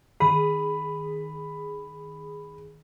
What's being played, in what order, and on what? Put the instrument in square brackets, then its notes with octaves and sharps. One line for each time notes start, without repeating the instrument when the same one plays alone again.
[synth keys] D#3 G#4 [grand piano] B5